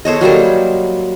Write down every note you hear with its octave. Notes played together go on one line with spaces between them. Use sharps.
A4 C5 C#5 D#5
F#3 G3 A#3 C5